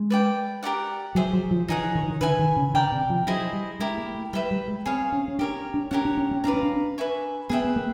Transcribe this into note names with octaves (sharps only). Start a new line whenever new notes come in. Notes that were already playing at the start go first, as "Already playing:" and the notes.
Already playing: G#3
B4 D5 G5
G4 A#4 D5 F#5
F#3 G#4 C5 E5
F#3
F3
E3 D#4 G#4 C#5 F#5
D#3
E3
D#3
D3 B4 E5 G#5
D#3
C#3
D3 A#4 D5 G5
C3
F3
F#3 E4 G#4 C5 D#5
G3
G#3 E4 G4 A#4
A#3
A3
G3 B4 E5 G5 B5
G3
G#3
C4 G#4 C#5 F5
C#4
C#4
D4 G4 A#4 C#5
D4
C#4 G4 A#4 C#5 F#5
D4
C#4
C#4
D4 B4 D5 F5 A#5
C#4
D4
B4 E5 G#5 C#6
B3 G#4 B4 E5 G5
B3
A#3